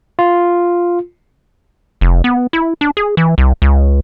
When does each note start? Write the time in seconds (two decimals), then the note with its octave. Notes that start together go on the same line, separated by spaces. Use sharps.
0.19 F4
2.01 F1
2.24 B3
2.53 E4
2.81 D4
2.97 G#4
3.17 E3
3.38 C2
3.62 C#2